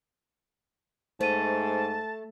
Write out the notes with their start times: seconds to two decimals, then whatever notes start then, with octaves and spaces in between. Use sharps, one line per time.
1.21 G#2 A3 C5 A5 D#7